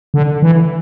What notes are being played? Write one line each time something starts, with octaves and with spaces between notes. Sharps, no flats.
D3
E3